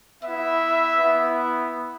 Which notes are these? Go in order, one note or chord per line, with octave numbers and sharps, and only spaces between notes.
B3 E4 E5
B3 E4